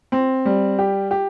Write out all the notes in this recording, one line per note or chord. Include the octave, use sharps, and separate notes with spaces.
C4
G3
G4
G4